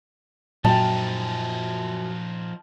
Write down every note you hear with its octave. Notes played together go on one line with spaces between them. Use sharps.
F#2 A#2 F3 D#4 G5 A5